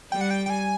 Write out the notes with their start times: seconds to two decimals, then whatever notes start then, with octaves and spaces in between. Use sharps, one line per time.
0.12 G3 G5
0.21 F#5
0.31 G5
0.46 G5
0.50 G#5